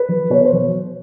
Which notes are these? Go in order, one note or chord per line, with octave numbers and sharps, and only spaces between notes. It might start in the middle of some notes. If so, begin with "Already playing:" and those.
Already playing: B4
F#3
B2 C#5
C5
F#3